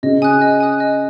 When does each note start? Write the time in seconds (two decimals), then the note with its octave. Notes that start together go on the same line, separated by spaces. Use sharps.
0.03 C#3 D#5
0.22 G#5 D#6 F#6
0.41 D#5
0.61 G#5 D#6 F#6
0.80 D#5